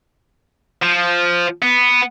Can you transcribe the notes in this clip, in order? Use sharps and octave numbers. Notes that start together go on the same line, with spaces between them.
F3
B3